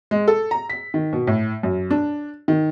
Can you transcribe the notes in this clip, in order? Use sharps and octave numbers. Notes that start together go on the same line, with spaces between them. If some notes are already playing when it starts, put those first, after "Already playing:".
G#3
A4
A#5
B6
D#3
B2
A2
F#2
D4
D#3